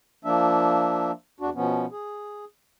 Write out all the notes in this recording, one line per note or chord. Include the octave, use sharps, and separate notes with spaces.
F3 A#3 D4 E5
E2 D4 F#4
B2 F3 B3 C#4
G#4